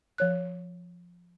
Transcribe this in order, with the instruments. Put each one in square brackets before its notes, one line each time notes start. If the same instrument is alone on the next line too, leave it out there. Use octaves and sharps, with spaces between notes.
[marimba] F3 C#5 F#6